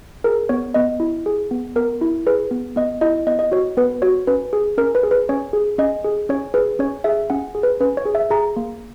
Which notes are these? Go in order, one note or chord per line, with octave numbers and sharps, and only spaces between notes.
G#4 A#4
B3 C#5
B3 D#5
E4
G#4
B3
B3 A#4
E4
G#4 B4
B3
B3 D#5
E4 D#5
B3 D#5
D#5
F#4 C#5
B3 B4
F#4 C#5
C#4 B4
G#4
C#4 A#4
B4
G#4
B4
C#4 C#5
G#4
C#4 D#5
G#4
C#4 C#5
G#4 B4
C#4 C#5
G#4 E5
C#4 F#5
G#4
B4
C#4 B4
C#5
G#4
E5
G#4 A#5
A#3